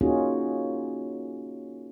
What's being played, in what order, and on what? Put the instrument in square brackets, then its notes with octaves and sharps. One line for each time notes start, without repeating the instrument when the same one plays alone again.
[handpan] A#3 C#4 D#4 F4 F#4 G#4